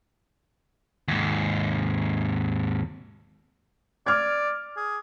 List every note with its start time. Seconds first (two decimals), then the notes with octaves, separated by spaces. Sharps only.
1.08 D#2 G#2
4.06 D5 D6 F6 G#6
4.77 G#4